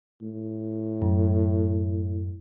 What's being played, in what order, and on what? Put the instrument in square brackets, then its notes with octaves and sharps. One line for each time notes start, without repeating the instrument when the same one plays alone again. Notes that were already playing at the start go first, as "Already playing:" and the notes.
[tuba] A2
[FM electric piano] F#2